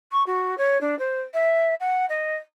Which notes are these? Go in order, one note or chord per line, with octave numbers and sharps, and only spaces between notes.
C#6
F#4
C#5
D4
C5
E5
F#5
D#5